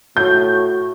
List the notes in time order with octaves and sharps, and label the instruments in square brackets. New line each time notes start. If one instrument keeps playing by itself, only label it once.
[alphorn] A2 [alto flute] F#4 [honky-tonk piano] G6